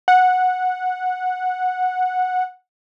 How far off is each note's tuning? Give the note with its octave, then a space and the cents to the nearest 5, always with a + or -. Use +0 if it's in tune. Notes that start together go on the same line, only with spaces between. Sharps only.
F#5 -10